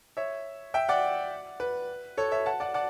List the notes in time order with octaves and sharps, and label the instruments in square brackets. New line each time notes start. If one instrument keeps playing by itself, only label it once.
[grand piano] C#5 E5
E5 G5
D5 F#5
B4
A4 C#5
C#5 E5
F#5 A5
D5 F#5
D5 F#5